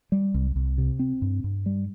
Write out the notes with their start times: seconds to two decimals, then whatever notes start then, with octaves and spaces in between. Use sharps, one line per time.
0.12 G3
0.34 C2
0.56 C2
0.78 C3
0.99 C4
1.22 G2
1.44 G2
1.66 G3